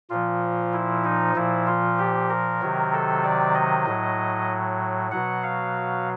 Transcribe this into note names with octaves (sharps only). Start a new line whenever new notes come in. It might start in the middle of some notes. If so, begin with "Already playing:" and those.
A#2 F3 F4
E4
D#4
A#2 F3 E4
F4
G4
A#4
C3 D#3 F#3
A4
D5
D#5
A2 F#3
B2 F#3 F#5
F5